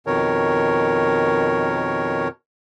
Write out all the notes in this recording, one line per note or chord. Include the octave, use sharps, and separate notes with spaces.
F2 B2 D#3 A#4 C#5